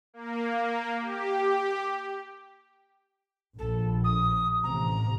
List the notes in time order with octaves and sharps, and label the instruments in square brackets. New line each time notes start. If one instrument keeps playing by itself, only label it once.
[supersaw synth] A#3
G4
[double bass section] A#1 [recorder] A4
[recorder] D#6
[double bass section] A1 C3 [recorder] A#5